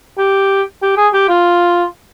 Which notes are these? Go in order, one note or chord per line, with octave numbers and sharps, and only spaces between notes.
G4
G4
G#4
G4
F4